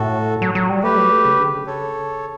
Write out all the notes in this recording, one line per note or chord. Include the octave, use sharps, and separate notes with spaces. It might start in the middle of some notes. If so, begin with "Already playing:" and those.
Already playing: A2 F#4 A4
F#3
F#3
G3
A3 G4 B4
F#3
A3
C#3
D3
C#3
A4 C#5